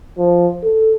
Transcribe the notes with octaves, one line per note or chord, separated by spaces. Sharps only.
F3
A4